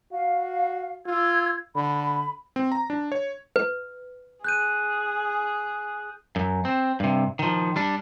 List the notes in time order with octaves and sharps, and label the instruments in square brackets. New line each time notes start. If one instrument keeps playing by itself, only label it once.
[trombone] F#4 [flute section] F5
[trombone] F4 [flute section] E6 G#6
[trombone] D3 [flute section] B5
[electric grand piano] C4
A#5
D4
C#5
[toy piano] B4
[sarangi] G#4 [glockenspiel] F#6 G6 D#7
[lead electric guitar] F#2
C4
G2 C3
D#3 F3
G3 D4